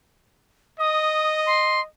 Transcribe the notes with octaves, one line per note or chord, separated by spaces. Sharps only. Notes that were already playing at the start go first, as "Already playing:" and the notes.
D#5 D#6
C6